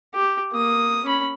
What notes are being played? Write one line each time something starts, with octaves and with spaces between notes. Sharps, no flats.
G4
A#3 D#6
C#4 B5